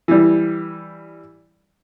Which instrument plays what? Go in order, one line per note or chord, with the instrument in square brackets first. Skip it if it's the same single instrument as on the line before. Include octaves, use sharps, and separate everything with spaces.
[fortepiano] E3 G3